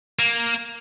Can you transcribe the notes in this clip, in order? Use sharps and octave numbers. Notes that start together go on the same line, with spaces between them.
A#3